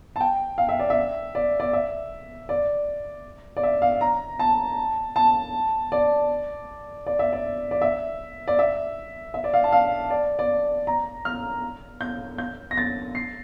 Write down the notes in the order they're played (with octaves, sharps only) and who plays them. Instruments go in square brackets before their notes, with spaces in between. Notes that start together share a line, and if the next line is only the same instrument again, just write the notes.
[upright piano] A5
G5
F5
E5
D5
E5
D5
D5
E5
D5
D5
E5
F5
A#5
A5
A5
D5
D5
E5
D5
D5
E5
D5
E5
E5
D5
F5
A5
F5
D5
D5
A#5
F6
G6
G6
A#6
A6
C7